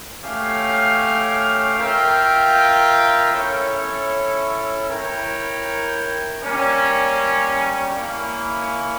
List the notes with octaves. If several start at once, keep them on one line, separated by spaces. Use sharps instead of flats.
A3 C#4 G4 C#5 F5
F4 A#4 E5 G5
C#4 E4 A4 C#5
E4 A#4 C#5 G5
G3 A#3 C#4
A#3 C#4 E4